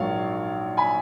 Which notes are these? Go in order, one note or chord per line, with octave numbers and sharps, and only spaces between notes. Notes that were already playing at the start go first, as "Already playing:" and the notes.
Already playing: A#1 G#2 D#3 F#3 C#5 F5
G#5 B5